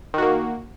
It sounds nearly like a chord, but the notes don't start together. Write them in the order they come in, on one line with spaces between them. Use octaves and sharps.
D#3 F#4 A#3